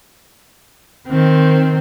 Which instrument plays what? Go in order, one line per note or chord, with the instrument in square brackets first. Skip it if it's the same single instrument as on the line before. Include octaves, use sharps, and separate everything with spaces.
[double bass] D#3 C4